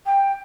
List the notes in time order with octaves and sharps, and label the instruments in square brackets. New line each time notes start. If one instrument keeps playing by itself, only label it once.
[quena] G5